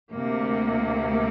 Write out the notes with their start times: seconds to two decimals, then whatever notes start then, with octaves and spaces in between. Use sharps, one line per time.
0.11 D2 C3 A#3